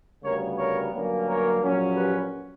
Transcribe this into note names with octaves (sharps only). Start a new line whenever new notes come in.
D2 C#3 G3 B3 A#4 C#5
A#4 C#5
G1 G2 F#3 A#3 C#4
A#4 C#5
A#1 A#2 F#3 C#4
G4 B4